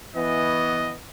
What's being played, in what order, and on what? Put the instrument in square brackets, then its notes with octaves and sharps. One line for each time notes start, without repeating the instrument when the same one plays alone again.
[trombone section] E3 B3 [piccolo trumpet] D#5